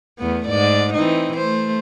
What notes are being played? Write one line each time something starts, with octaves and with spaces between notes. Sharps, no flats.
E2 A3 B3
G#2 D5
E3 C4 D#4
A3 C5